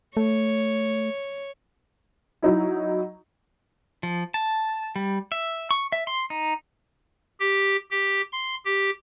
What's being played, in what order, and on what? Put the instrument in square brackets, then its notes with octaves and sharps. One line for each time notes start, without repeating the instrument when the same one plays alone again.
[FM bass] A3 [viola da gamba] C#5
[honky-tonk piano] F#3 D#4 E4
[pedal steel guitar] F3
A5
G3
E5
C#6
E5
C6
D#4
[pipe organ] G4
G4
C6
G4